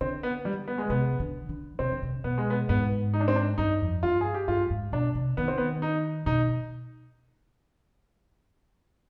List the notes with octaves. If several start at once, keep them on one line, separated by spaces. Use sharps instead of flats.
D3 C4
B3
G3
B3
G#3
C3 B3
D3
D3
C3 C4
D3
C3
B2 B3
G#3
B3
G#2 B3
D#4
D4
C4
D4
G2 D#4
F2
G2 F4
G#4
G4
G2 F4
G#2
B2 D4
C3
D#3 B3
C4
B3
D#4
B2 D#4